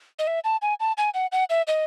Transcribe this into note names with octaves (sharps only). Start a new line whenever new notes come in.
D#5
E5
A5
G#5
A5
G#5
F#5
F#5
E5
D#5